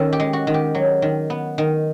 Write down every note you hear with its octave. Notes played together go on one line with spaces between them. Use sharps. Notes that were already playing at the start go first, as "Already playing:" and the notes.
Already playing: D#3 C#4 A4
G4
G#3
F#4
D#3
G4
F#3
D#3
B3
D#3